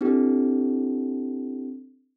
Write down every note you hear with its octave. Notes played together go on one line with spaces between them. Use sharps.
C4 D4 E4 G4 A4